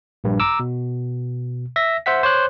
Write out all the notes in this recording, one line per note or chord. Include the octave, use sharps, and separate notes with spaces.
A#1 G2
A#5 D6 E6
B2
E5 A#6
C5 E5 F#5 B6
C5 C#5 D6 F#6